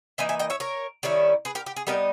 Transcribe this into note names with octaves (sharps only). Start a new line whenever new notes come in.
E3 A#3 D#4 E5 G#5
E5 G#5
D#5 G5
C#5 E5
A#4 C#5
D#3 G3 C#4 E4
G#4 B4
G4 A#4
G4
G#4
G3 B3 D#4 G4 A#4